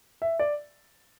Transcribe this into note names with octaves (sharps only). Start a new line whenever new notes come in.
E5
D5